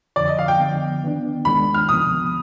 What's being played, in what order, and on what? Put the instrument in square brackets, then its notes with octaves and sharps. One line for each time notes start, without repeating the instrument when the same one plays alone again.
[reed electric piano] F2 D3 F3 [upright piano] D5
[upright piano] D#5
F5
G5
[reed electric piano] D3 F3 B3
D#3 B3 D4
[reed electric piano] D#2 D#3 G#3 D4 [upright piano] B5
[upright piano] F6
[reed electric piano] D2 C3 F3 B3 [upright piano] D#6